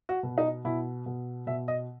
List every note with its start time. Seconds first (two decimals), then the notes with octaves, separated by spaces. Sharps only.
0.09 F#4
0.23 B2
0.38 D#4
0.65 B2 E4
1.06 B2
1.47 B2 E5
1.68 D#5